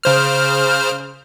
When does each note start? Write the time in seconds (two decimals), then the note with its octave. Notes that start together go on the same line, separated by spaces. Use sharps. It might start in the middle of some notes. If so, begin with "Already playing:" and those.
0.04 C#3 C5 F6